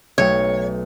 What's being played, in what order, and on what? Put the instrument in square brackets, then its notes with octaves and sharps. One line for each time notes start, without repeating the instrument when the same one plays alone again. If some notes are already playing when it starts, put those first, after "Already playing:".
[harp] B1 A3 G5 [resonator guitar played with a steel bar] C#5